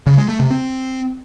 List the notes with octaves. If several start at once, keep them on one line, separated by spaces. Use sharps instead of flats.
C#3
G#3
A3
C3
C4